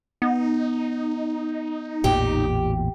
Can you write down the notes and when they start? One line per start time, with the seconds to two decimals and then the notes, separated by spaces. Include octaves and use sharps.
0.22 B3 D#4
2.04 A1 E2 A#2 G4